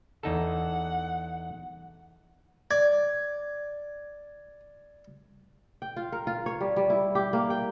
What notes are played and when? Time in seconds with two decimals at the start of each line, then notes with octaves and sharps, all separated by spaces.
0.23 E2 D#4 A4 F#5
2.71 D5 G#6
5.82 G5
5.96 F4
6.12 A#4
6.27 F4
6.46 C#5
6.61 G3
6.76 G3
6.90 E4
7.15 G4
7.33 A#3
7.50 G5